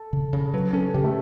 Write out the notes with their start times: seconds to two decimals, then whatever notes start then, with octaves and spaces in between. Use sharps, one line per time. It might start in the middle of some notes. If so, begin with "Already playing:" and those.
Already playing: A4
0.13 C#3
0.33 C#3
0.54 F#3 B4
0.73 C#4 A4
0.94 C#3 G4
1.04 A3